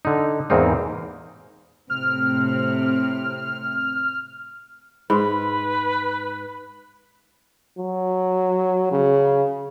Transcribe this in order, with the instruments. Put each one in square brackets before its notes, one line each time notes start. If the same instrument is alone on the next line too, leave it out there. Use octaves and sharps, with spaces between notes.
[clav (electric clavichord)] D3 D#4
E2 G#2 A#3 C4 D#4
[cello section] A2 C3 C4 [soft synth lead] F6
[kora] G#2 [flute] B4 [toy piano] B5 C6
[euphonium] F#3
C#3